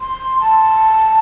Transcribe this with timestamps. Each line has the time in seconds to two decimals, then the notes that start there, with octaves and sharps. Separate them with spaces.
0.01 C6
0.41 A5